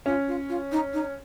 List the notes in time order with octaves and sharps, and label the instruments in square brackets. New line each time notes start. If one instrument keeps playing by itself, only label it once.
[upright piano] C#4 [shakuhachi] F4
[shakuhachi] F4
F4
D#4
D#4